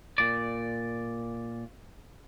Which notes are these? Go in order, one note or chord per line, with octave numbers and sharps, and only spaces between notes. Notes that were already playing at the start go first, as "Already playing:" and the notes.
A#2 D5